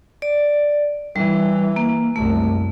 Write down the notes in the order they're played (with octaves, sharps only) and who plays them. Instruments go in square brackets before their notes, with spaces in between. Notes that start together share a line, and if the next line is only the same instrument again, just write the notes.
[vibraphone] D5
[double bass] E3 [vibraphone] G3
[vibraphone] A#3
[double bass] C2 F#2 [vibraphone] A3